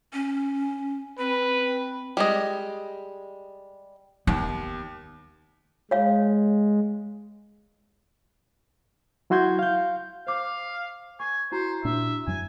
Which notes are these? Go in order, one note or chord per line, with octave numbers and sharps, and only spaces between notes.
C#4
C4 B4
G3 G#3 D#5
D#2 B3
G#3 C#5 F5
F#3 E4 F#4 C6 G6 G#6
F5 G6
C5 F5 D6
G#5 C#6
E4 F#4 C5 A#5
A#2 D4 E5
F#2 F#3 G#5